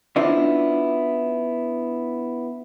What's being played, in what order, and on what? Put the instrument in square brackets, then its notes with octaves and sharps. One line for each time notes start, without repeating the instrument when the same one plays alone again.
[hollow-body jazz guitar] B3 C#4 D4 E4 F4 C5